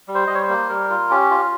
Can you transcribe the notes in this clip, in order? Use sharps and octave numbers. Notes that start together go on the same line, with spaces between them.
G3
C5
G3 D#5
C#5
C5
A#3
G3 A#4
F4
C#4 G4
F4